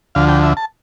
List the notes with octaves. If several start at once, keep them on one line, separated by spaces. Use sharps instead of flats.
D2 D3 F3 F5
G5
E5
A5